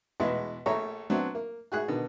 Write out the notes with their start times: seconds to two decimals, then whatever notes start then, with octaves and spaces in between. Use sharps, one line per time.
0.20 E2 B2 G#3 E4
0.66 A#1 A3 C#5 A#5
1.10 F#3 B3 C4 D4
1.35 A#3
1.72 F#4 G#4 F#6
1.88 B2 D3 D#3